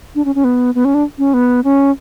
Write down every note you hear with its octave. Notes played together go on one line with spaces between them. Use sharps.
D4
C#4
C#4
B3
B3
C#4
D4
C#4
B3
C#4